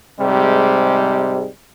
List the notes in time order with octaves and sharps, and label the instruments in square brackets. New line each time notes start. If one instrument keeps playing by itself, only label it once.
[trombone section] G#2 C3 G3 G#3